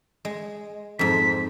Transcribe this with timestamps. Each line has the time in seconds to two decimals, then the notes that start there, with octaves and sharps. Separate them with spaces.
0.25 G#3
0.99 F2 G#2 B6